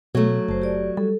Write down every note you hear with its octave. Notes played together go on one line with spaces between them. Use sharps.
B2 F#3 A3
F#1 C5 A5
G4 D5
G3 A4